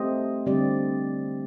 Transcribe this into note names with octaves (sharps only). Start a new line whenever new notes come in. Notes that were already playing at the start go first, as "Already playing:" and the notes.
Already playing: A3 C4 G4 C5 D#5
D3 G3 C4 G4 D5